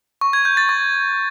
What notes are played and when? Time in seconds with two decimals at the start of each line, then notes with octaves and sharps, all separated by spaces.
0.21 C#6
0.33 G#6
0.45 G6
0.57 A6
0.69 C#6